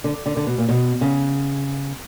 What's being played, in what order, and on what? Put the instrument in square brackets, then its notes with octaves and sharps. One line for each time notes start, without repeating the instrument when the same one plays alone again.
[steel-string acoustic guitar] D3
D3
D3
B2
A#2
B2
C#3